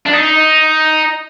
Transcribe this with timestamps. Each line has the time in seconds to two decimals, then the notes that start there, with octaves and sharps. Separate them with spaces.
0.06 D4
0.13 D#4